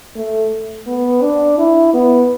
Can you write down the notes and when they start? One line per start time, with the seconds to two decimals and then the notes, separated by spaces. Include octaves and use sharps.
0.15 A3
0.87 B3
1.22 D4
1.58 E4
1.93 B3